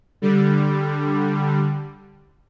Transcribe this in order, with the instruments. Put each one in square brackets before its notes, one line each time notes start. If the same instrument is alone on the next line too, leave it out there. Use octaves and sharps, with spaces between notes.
[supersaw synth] D3 G3